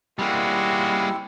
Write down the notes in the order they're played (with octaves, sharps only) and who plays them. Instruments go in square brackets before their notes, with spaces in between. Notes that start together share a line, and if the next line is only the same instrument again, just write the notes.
[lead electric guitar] G3 A#3 [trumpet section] G#3 F#4 [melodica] C4 E4 E6